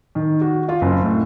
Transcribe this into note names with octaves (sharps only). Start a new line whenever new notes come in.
D#3
F#4
F4
F#1
A2